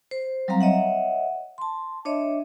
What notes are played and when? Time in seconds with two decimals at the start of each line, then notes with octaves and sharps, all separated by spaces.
0.11 C5
0.48 F#3 G3 C4 F5 A#5
0.61 C#5 D#5 E5 F#5
1.58 A5 C6
2.05 D4 C#5 D#5 E5